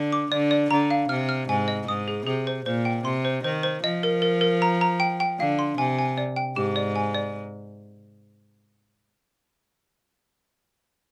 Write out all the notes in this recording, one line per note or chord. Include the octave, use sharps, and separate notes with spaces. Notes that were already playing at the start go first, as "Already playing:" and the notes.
Already playing: D3
D6
D3 D5
D5
D3 A#5
F5
C3 F6
F6
G#2 G#5
D#5
G#2 D#6
G#4
C3 G#4
C5
A#2 C5
G5
C3 C6
C5
D#3 C5
C5
F3 D#5
A#4
A#4
A#4
A#5
A#5
G5
G5
D3 F5
C6
C3 G#5
G#5
D5
G5
G#2 G4
D5
G#5
D5